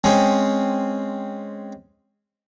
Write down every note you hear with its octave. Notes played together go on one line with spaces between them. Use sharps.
G#3 C4 C#4